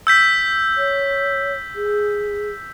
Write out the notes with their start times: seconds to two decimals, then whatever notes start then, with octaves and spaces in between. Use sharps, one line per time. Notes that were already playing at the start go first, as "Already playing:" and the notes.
0.07 E6 G6 B6
0.77 C#5
1.75 G#4